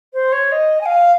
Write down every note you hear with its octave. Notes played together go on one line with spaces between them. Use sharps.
C5
C#5
D#5
G#5
F5